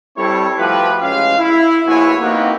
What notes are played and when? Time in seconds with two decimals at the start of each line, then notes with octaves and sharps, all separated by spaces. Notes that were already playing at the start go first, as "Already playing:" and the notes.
0.16 G3 C4 E4 A4 C#5
0.57 F3 A3 F#4 G4 B4
1.00 A1 G#3 C#4 F4 F5
1.38 E4
1.87 A#1 B3 E4 F#4 C#5 G#5
2.20 A#3 C4 D#4 F#4 G4 B4